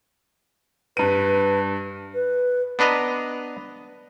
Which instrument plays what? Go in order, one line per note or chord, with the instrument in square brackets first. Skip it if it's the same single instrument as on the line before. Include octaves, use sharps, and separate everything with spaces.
[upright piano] G2 D#7 [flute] B4
[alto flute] B4
[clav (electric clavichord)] B3 D4 B4 D#5 A#5